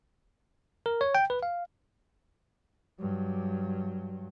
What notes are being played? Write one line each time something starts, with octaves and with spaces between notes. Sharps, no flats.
A#4
C#5
G5
B4
F5
G2 F#3